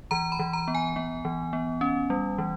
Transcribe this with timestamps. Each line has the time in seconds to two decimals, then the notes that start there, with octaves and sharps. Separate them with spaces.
0.11 E3 A#5
0.32 B5
0.39 E3
0.53 A#5
0.68 B3
0.75 G#5
0.96 B3
1.25 E3
1.53 B3
1.81 C#4
2.10 G3
2.38 E3